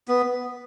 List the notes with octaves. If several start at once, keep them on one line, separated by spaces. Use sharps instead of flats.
B3